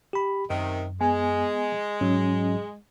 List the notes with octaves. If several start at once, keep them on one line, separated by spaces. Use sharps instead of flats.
G4 B5
F#2 C3 D#3
G#3 B3 G#5
G#2 F#3 C#4